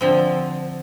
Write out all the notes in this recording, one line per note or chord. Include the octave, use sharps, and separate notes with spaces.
D3 F3 C4